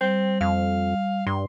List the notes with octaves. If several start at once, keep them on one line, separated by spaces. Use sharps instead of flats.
G3 C4
F2 F5
G2 C6